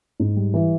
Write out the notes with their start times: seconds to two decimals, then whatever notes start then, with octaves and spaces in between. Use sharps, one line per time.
0.20 G#2
0.37 G3
0.54 E3